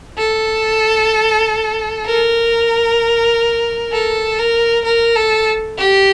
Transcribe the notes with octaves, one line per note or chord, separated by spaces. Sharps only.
A4
A#4
A4
A#4
A#4
A4
G4